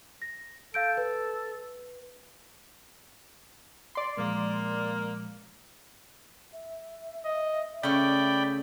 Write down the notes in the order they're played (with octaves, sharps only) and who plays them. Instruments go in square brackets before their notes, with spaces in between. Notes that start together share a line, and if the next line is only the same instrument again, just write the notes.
[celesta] A#6
[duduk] A4 [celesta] F5 G6 D7
[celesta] B4
[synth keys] D5 C6
[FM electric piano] A#2 F3 G#3 [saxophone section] A#3
[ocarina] E5
[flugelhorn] D#5
[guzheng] C#3 A3 [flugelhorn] D5 [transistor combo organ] G5 B5